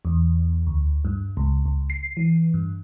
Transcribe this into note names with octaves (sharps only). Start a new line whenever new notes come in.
E2
D2
G2
C#2
C#2
C7
E3
G2